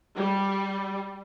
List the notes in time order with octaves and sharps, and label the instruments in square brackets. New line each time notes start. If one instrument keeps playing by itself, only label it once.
[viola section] G3